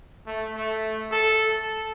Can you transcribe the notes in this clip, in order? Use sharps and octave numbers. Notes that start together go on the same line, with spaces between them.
A3
A3
A4